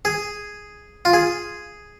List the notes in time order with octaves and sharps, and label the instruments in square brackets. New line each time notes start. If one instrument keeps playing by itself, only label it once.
[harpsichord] G#4
F4
G#4